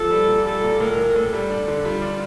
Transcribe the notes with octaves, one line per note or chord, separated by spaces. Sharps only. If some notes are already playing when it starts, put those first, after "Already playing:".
Already playing: F3 A4
G3
A#2
G3 A4
A#2
A2 A#4
A2
A2 A4
G3
D4
D3
G3 F4
D4